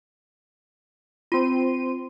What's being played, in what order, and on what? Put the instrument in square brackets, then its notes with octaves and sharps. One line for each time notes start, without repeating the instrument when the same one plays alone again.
[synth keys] C4 C6 D#7 [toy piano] F4